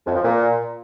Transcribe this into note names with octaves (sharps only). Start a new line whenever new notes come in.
F2
F3
A#2